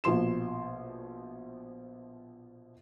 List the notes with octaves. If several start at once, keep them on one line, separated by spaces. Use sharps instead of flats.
A#1 B2 F3 C6 E7